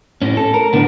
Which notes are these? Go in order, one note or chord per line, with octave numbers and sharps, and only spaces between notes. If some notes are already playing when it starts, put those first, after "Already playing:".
A2 C#4
A4
A#4
A2 D3 B3